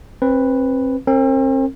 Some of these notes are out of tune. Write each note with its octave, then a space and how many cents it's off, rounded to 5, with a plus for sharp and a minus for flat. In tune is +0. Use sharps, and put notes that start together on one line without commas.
C4 +30 B4 +0
C4 +40 A#4 -30